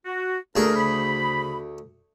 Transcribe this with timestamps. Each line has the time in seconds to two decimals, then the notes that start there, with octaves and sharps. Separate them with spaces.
0.05 F#4
0.56 D2 G#4 A#4
0.74 C#3 C5 B5